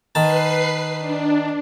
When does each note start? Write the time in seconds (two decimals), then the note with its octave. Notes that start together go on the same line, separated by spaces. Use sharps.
0.15 D#3 B4 A5 C7
0.98 D4